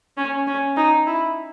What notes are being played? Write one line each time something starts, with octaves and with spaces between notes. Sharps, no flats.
C#4
C#4
D#4
E4